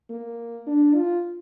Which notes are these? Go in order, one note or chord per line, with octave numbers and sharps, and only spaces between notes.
A#3
D4
F4